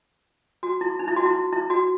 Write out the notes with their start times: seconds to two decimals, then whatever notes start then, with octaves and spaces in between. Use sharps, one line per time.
0.63 F#4
0.81 E4
0.99 D#4
1.08 E4
1.16 F#4
1.26 E4
1.52 E4
1.70 F#4